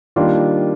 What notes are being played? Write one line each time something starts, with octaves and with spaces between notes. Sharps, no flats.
D#3 G3 A#3 D4 F4